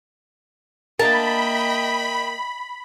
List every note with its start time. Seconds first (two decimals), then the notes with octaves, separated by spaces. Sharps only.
0.99 A#3 D4 A#4 D#5 E5 G5 A5 B5